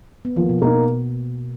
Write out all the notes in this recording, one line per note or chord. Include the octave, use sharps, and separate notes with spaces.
B3
F3 A#3
B2
B2 A#3 D#4